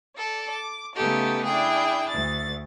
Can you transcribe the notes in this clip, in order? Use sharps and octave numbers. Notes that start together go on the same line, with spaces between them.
A4 D5
D6
C#3 A3 B3 D#4 G4 A4
D4 E4 G#4 G5
D2 A6